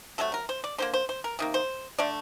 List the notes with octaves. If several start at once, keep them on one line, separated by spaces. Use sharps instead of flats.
C3 F#3 A3 A4
A#4
C5
D5
D3 F#3 A#3 C5
C5
C5
A#4
C3 D#3 A#3
C5
D3 A3 D5